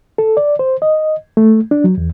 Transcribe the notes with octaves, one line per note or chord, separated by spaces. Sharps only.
A4
D5
C5
D#5
A3
D4
F#3
E2